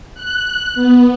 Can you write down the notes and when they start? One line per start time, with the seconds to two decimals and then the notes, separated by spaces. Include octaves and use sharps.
0.14 F#6
0.75 B3